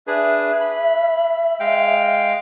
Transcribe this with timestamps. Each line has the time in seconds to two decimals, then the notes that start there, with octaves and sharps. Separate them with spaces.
0.07 D4 G#4 B4 E5
0.61 B5
1.60 G#3 F5 G5